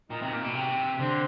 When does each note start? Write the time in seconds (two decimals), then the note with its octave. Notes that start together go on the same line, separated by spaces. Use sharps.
0.10 A#2 D#4
0.22 C3
0.33 A#2
0.45 B2
0.55 C3
1.00 D3 C4